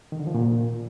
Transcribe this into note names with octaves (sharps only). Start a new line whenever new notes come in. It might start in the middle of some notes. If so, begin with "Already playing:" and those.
D#3
D3
F3
A#2